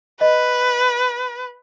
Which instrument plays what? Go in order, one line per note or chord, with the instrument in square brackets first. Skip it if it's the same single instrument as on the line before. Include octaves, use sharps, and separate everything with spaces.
[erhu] B4 [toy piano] D#5